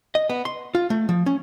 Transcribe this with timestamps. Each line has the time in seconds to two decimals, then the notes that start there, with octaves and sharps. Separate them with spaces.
0.15 D#5
0.29 B3
0.45 C6
0.75 F4
0.90 A3
1.09 F3
1.26 C#4